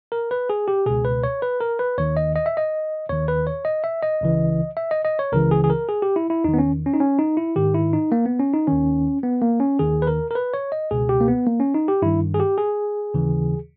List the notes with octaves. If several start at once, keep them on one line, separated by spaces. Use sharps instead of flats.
A#4
B4
G#4
G4
C#2 B2 G#4
B4
C#5
B4
A#4
B4
D#2 D#3 C#5
D#5
D#5
E5
D#5
D#2 D#3 C#5
B4
C#5
D#5
E5
D#5
C#2 C#3 E3
E5
D#5
D#5
C#5
C#2 C#3 E3 A#4
G#4
G#4
A#4
G#4
G4
E4
E4
E2 D#3 D#4
B3
C#4
C#4
D#4
C#4
D#4
E4
G#2 D#3 G4
E4
D#4
A#3
B3
C#4
D#4
D#2 D#3 C#4
B3
A#3
C#4
D#2 D#3 G#4
B4
A#4
A#4
B4
C#5
D#5
C#2 B2 G#4
G4
A#3
B3
A#3
C#4
D#4
G4
G2 D#3 E4
G#4
G4
G#4
D#2 C#3 E3